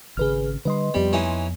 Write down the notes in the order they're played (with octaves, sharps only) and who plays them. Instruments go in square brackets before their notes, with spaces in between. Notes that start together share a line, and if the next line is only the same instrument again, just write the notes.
[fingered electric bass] G#1 C#3 [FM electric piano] G#4 B4 F6
[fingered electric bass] D3 G3 [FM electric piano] B4 D#5 C6
[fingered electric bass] F2 B3 [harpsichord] G3
[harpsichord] E3 C#4 D#4